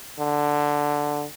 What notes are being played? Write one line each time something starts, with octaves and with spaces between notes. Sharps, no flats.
D3